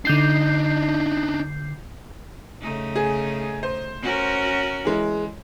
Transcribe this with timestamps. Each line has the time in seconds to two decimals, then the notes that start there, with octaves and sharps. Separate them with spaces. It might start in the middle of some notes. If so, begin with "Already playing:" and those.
0.05 D3 D4 D#4 G6 C7
2.61 C#3 A3 D#4
2.96 G#4
3.63 C5
4.02 C#4 F#4 A#4
4.85 E3 G#3